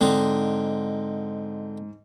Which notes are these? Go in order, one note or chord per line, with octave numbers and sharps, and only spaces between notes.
G#2 D3 C4 D#4